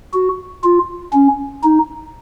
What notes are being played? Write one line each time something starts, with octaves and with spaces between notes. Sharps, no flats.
F#4
F4
C#4
D#4